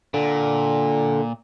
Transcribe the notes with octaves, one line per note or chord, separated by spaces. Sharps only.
A#2 D3